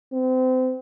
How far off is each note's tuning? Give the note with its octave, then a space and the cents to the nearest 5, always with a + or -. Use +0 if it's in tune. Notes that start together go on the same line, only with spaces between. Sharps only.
C4 -30